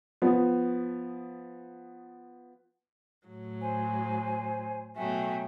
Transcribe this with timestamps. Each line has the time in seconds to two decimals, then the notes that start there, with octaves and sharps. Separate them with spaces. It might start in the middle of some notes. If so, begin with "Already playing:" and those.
0.22 F3 B3
3.27 A2 F#3
3.61 C5 G#5
4.95 B2 F#3 A3 E5 G5 G#5